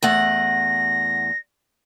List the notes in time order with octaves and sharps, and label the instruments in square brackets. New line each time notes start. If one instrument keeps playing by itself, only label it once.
[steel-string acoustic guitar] E2 A3 F#5 [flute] A#6